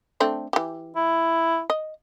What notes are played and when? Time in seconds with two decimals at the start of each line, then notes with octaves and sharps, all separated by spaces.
0.20 A3 C4 D4
0.53 E3 G4
0.95 E4
1.70 D#5